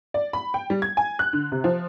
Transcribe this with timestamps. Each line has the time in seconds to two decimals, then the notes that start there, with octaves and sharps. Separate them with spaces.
0.14 D5
0.33 B5
0.54 G5
0.70 G3
0.82 G#6
0.97 G#5
1.19 F#6
1.33 D3
1.52 C3
1.64 F3